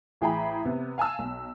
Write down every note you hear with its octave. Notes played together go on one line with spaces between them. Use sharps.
A1 E3 G#4 G5 A#5 B5
C3 B3
F5 G#5 A5 E6
B1